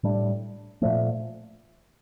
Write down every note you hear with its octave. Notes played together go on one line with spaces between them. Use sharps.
A2 G3 D4
A#2 F3 A3